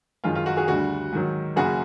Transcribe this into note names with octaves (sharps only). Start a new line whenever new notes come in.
F#2 D#3 G#3 F4
F4
F#4
F#4 G#4
D2 D3 G3 F#4
G#2 D#3 F#3
F#1 F#2 C#3 F#4 G#4